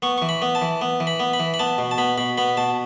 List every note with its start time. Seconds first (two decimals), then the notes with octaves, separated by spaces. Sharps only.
0.02 B3 C#6
0.18 E3 C#6
0.29 B5
0.42 B3
0.55 A5
0.62 E3
0.81 B3
1.00 E3
1.07 B5
1.20 B3
1.33 B5
1.40 E3
1.54 B5
1.59 B3 A5
1.78 B2
1.91 A5
1.98 B3 B5
2.18 B2 B5
2.38 B3 B5
2.57 B2 A5